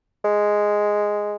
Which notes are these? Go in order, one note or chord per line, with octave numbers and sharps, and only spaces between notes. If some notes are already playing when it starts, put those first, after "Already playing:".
G#3